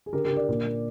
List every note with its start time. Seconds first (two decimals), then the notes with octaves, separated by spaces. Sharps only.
0.06 G#4
0.13 D3 G4 A#4
0.25 G4 A#4
0.30 D3
0.37 A#4 D5
0.48 A#2
0.66 A#3